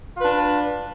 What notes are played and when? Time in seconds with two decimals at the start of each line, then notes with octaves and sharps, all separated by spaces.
0.16 F4
0.20 B4
0.24 D4